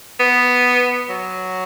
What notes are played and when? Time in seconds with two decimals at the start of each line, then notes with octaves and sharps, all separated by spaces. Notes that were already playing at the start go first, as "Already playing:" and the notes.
0.20 B3
1.09 F#3